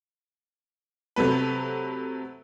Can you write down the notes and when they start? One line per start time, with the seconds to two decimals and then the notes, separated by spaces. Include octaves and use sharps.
1.16 C3 F#3 A3 B4